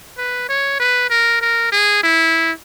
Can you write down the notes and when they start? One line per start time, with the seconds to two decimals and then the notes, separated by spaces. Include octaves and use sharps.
0.18 B4
0.49 C#5
0.80 B4
1.10 A#4
1.41 A#4
1.72 G#4
2.03 E4